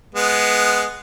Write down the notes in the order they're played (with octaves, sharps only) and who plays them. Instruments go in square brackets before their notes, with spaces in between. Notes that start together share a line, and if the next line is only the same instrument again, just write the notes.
[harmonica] G#3 B3